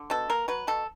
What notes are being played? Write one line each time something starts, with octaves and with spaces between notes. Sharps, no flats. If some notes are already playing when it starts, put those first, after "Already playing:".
Already playing: D3
B2 A4
A#3 A#4
F#3 B4
B2 A4